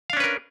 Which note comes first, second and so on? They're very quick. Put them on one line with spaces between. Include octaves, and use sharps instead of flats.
F5 D4 C#4 B4 A#4